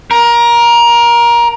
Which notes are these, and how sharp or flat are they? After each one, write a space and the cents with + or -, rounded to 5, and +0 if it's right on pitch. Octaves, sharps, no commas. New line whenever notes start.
A#4 +20